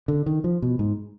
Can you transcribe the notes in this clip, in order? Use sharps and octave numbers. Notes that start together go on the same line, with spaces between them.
D3
D#3
F3
B2
G#2